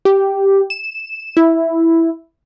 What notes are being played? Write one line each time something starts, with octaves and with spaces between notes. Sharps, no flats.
G4
E7
E4